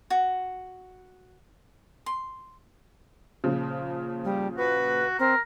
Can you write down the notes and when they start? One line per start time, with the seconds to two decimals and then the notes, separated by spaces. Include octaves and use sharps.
0.10 F#4
2.06 C6
3.44 A#2 C#3 F3
4.25 G3
4.57 F#4 B4
5.19 C4 A#4